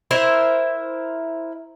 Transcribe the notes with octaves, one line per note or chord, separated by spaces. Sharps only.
E4 A#4 C5 E5